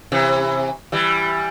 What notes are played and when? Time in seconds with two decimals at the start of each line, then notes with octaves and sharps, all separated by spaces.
0.12 C3 E3
0.92 E3 G3